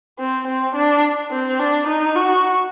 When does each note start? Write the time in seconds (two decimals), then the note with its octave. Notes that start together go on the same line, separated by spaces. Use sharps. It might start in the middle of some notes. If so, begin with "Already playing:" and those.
0.18 C4
0.47 C4
0.75 D4
1.31 C4
1.59 D4
1.87 D#4
2.16 F#4